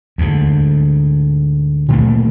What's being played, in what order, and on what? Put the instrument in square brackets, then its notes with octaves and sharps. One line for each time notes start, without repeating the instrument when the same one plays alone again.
[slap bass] D2 G#2
A#2 D#3 A3 A#3